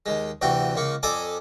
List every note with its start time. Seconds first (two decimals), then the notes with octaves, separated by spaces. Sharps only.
0.06 D#2 G#3
0.41 D2 C3 E3 F#4 G5
0.76 C#2 A#3 C#6
1.03 F2 A4 D5 G#5 D6 D#6